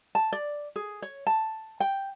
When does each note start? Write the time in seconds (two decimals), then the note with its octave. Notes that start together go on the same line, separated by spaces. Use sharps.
0.15 A5
0.32 D5
0.76 G#4
1.02 C#5
1.27 A5
1.80 G5